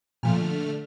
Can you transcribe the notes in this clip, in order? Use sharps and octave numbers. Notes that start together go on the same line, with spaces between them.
A#2 D3 F3 A3 F6